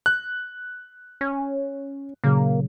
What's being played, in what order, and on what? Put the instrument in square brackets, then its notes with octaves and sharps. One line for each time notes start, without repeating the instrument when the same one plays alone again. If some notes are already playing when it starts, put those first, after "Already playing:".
[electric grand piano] F#6
[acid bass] C#4
[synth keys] A#2 C#3 F#3 [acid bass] A#3